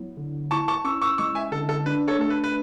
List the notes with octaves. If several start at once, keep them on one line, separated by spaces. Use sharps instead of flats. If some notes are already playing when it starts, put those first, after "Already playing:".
Already playing: F#3 B3 E4
D3
E4 A5 C#6
A5 C#6
C#4 C#6 E6
C#6 E6
G#3 C#6 E6
E5 G#5
D3 A4
A4
D4 B4
A4 C#5
A3 A4
B4
B4